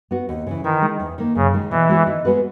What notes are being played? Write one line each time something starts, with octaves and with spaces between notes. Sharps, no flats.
B3 F#4
D#2
C#3 E3
D#3 E3
G#3 D#4
E2
D#3 A#3
F#2 C#3
D#3 G#3
B2 E3
G#3 B3 F#4 C#5
D#3
G#3 B3 F#4 B4